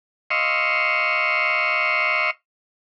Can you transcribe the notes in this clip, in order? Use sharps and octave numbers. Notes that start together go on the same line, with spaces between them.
D#5 F5 C6 C#6 E6